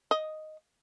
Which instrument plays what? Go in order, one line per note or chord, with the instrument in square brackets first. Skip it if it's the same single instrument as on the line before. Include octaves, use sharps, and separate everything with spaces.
[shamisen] D#5